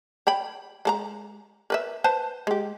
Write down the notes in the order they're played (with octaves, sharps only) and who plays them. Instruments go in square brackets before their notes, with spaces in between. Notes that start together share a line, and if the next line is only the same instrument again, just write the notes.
[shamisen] C#5 G5 B5
G#3 A4 A#5
A#4 B4 E5
B4 C5 A5
G#3 G4